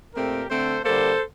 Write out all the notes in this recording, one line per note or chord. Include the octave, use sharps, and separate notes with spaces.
A#2 A3 C4 G4 A#4
D3 A3 C4 A4 C5
D3 G3 A#3 A4 C5